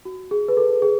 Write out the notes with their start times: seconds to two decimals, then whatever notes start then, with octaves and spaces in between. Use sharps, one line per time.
0.05 F#4
0.31 G#4
0.48 B4
0.57 A4
0.82 G#4